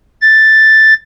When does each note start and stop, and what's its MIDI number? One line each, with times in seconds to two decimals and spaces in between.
0.21 0.94 93